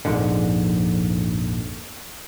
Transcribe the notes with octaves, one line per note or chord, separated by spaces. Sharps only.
A#1 F2 G#2 D3